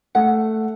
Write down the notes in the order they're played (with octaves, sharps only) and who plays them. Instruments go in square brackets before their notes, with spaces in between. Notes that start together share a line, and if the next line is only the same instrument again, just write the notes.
[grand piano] A3 [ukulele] F#5